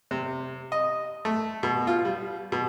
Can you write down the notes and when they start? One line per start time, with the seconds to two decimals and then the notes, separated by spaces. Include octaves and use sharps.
0.11 C3
0.72 D#5
1.25 A3
1.63 B2
1.87 F4
2.05 G3
2.52 B2